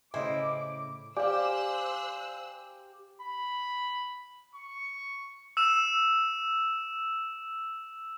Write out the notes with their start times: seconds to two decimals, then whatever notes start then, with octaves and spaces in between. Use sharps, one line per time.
0.14 A2 C#3 C#4 E4 C5 D#5 D6
1.17 G4 C5 D5 F5 G#5 E6 F#6
3.22 B5
4.55 C#6
5.57 E6 E7